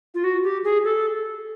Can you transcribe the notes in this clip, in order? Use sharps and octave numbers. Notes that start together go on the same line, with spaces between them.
F4
F#4
G4
G#4
A4